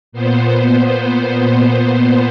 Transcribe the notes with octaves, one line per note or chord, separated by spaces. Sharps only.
A#2 B3 C5